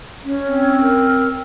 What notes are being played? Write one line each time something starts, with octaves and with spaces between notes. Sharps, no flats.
C#4
C4
A#4